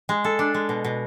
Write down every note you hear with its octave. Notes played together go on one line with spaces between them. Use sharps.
G#3
A4
D4
G#3
B2
B2